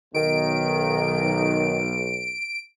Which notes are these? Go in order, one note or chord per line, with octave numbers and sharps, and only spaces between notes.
B1 D#3 D7